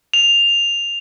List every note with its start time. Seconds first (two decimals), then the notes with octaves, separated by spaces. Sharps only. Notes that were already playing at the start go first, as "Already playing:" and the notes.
0.14 F7